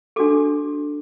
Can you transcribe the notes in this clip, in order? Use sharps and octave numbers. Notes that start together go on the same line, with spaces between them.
D4 F#4 A4 D6